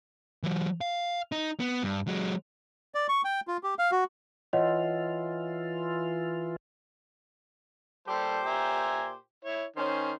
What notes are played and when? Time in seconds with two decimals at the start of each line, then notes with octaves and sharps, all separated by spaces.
0.43 E3 F#3
0.81 F5
1.32 D#4
1.60 B3
1.82 G2
2.07 F#3 G#3
2.95 D5
3.09 C#6
3.24 G5
3.48 F4
3.63 G4
3.79 F5
3.92 F#4
4.53 E3 F4 C#5 D#5 F#5
8.08 A#2 G3 G4 A4 C5
8.46 E5 G#5 A#5
9.45 E4 C#5
9.76 D#3 C#4 C5